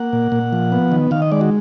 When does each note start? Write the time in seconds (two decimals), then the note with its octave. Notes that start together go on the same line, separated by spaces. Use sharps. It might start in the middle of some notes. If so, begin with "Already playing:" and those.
Already playing: A#3 F#5
0.13 A#2
0.32 A#2
0.53 F3
0.72 B3
0.92 D#3
1.11 D#3 F5
1.22 D#5
1.32 G#3 D5
1.41 F#4